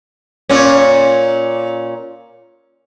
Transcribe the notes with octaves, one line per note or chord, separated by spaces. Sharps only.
A#2 C#4